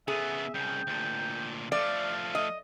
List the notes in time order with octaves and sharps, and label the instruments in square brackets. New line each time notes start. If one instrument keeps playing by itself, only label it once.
[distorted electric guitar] C#3 B3 [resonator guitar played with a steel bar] G#4 [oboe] E5
[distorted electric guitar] C2 C#3 [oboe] G5
[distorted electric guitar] D2 A#2
[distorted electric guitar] F3 A3 [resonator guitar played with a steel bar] D5 [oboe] F5
[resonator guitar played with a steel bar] D#5